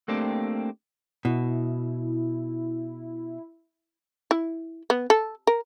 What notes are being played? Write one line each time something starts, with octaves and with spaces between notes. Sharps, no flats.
A3 A#3 C4 D4 G4
B2 E4
E4
B3
A4
A#4